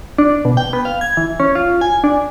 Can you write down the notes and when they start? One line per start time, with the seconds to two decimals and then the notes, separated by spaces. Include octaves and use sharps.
0.18 D4
0.45 B2
0.57 G5
0.73 B3
0.85 F5
1.01 G#6
1.17 E3
1.40 C#4
1.55 F4
1.81 G#5
2.04 D4